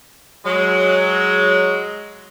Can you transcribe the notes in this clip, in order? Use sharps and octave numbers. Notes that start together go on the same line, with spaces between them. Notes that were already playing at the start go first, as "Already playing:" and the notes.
F#3 G#3